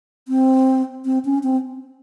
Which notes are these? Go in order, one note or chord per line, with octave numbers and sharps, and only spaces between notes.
C4
C4
C#4
C4